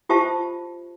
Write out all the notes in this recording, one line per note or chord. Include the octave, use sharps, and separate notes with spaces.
F4 G4 C5 E5 A5